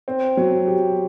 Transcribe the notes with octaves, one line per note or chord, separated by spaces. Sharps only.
C4
F#3
G4